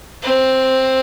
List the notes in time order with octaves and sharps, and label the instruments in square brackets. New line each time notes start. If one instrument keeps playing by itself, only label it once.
[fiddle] C4